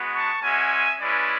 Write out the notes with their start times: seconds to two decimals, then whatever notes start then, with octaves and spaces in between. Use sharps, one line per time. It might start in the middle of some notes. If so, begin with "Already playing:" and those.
Already playing: G#3 B3 F#4
0.14 A5 C#6
0.43 G#3 C#4 F#4 E5 G#5
1.00 G#3 C#4 E4 B4 D5